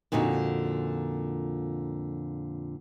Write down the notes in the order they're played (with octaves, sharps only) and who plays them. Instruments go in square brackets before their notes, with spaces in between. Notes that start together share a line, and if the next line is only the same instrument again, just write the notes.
[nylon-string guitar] F2 A#2 D3 D#4 F#4